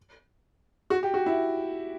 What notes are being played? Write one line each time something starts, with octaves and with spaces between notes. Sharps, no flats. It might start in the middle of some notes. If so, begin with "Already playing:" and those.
F#4
G4
F#4
E4